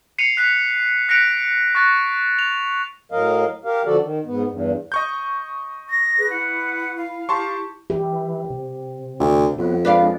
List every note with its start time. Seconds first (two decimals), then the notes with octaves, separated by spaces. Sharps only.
0.18 C7 C#7 D#7 F7
0.37 F#6 B6 F7
1.09 F#6 A#6 B6 C#7 D7 F7
1.75 C#6 F#6 A6 A#6
2.39 F7
3.12 A2 F#3 A#4 D#5 F5
3.64 G4 A#4 F5
3.86 D3 F3 F#4 A4 D5
4.02 D#3
4.25 G#2 B3
4.49 E2 G2
4.92 D#5 C#6 G6
5.90 A#6
6.18 G#4 B4
6.30 E4 F#5
6.97 F5
7.29 G4 A5 C6 C#6
7.90 E3 G4
8.50 C3
9.20 D2
9.58 F2 F#3 B3
9.85 G#3 D4 B4 D5 F5